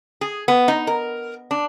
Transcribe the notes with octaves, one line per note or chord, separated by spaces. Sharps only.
G#4
B3
D#4
A#4
D4